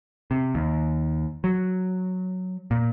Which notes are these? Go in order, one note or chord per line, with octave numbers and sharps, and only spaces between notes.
C3
D#2
F#3
A#2